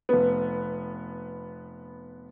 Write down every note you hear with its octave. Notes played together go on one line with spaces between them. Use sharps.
F1 B3